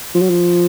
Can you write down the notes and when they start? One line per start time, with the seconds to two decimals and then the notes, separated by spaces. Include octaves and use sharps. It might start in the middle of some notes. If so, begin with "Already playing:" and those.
0.15 F3
0.22 F#3
0.30 F3